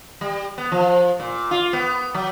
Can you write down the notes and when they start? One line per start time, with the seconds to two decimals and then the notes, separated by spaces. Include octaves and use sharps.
0.21 G3
0.58 B3
0.72 F3
1.20 A#2
1.51 F4
1.73 B3
2.14 F#3